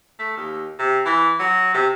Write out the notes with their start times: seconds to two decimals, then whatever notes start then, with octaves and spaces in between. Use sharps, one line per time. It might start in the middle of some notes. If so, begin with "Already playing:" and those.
0.19 A3
0.37 D#2
0.79 C3
1.06 E3
1.39 F#3
1.74 C3